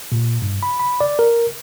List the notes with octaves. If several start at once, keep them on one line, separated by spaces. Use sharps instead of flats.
A#2
G2
B5
B5
D5
A#4